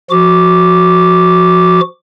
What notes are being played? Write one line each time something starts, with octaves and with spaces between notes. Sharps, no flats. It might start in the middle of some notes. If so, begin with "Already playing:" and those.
F3 F#4 D6